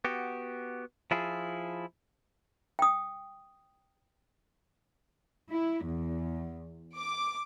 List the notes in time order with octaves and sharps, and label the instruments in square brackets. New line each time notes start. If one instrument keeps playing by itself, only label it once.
[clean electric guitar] B3 F#4 G4
F3 E4 F4 G#4
[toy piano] G5 D#6
[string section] E4
E2
D6